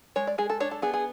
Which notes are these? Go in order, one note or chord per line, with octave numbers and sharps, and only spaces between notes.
G#3 C#5
D5
G#3 G#4
A4
D4 C#5
A4
B3 G#4
G#4